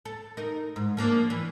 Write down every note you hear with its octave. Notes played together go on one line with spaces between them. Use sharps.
A4
D#4 A#4
G#2
F3 A#3 D4
E3